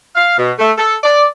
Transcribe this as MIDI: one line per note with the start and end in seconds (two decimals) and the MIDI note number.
0.15 0.37 77
0.38 0.52 47
0.59 0.72 57
0.78 0.94 69
1.03 1.24 74